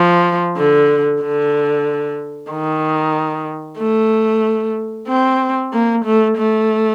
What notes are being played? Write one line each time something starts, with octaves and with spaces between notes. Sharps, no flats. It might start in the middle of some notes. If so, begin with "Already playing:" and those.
Already playing: F3
D3
D3
D#3
A3
C4
A#3
A3
A3